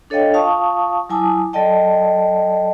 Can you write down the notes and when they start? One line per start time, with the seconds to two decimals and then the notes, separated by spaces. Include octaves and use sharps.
0.10 D4 A4 C#5 D#5 F5 G5
0.34 F4 F5 A5 C#6 D#6
1.09 F#3 E4 G#5 A5 D6 D#6
1.53 F#3 A4 D5 D#5 G5 A5